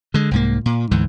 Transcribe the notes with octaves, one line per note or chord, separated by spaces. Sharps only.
D3 G#3
C2 G#2 A#3
A#2
D2 G#2 E3